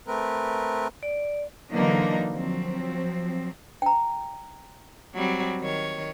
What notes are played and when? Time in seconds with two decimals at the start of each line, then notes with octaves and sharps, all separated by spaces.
0.07 A3 C4 A#4 B4
1.03 D5
1.72 D3 E3 F#3 A#3 D4 D#4
2.34 F3 F#3 C4
3.82 G5 A#5
5.15 F#3 G3 C4
5.61 D#3 C#5